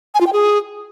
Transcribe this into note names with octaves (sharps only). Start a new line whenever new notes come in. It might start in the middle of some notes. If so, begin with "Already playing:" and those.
G#5
F4
G5
G#4